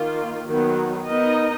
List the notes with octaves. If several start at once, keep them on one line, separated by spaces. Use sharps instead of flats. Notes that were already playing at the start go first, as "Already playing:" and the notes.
Already playing: D#3 A#3 F4
D#3 F#3 B3
B3 D#4 A#4 D#5